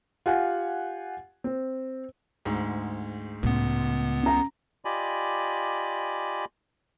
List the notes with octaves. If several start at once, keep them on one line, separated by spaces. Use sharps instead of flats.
F4 G4 F#5 G#5
C4
D2 G#2
C#2 A2 C#3 B3
C#4 A#5
F4 G4 D5 D#5 G#5 B5